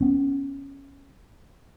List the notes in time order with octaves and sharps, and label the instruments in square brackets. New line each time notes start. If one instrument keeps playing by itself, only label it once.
[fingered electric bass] B3 C#4